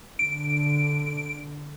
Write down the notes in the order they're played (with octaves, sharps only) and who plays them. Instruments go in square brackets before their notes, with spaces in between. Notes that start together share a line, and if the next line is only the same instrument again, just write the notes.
[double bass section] D3 [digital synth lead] D7